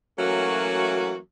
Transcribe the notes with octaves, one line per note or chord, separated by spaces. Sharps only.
E3 F#3 A3 A#3 C#4 F#4